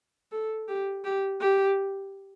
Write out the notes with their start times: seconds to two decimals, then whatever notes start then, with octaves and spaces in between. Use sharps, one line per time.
0.32 A4
0.68 G4
1.04 G4
1.41 G4